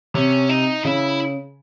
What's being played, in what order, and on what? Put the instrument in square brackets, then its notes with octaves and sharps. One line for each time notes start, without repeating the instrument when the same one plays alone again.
[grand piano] C3 [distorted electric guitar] C#4
[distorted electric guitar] D#4
[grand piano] C#3 [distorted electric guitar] E4